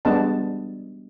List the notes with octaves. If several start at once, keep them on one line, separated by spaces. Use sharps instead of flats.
G3 G#3 B3 D4 D#5 A5